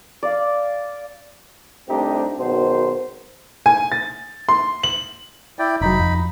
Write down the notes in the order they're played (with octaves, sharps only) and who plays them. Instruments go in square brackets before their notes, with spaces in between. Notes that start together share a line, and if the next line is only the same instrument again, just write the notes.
[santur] D5 F5
[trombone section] C2 A3 C4 D4 D#4 G4
G#1 F#2 B2 D#3 C5
[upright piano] G#5
A6
C6
F#7
[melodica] E4 D5 G5
[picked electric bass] F1 F#3 [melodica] D#4 B5
[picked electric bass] F2